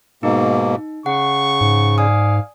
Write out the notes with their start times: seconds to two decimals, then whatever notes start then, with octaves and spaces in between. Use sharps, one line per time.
0.23 G#2 B2 A#3 D#4 G4
1.06 C#3 F#5 C#6
1.61 G#2
1.98 D5 F5 G#5 D#6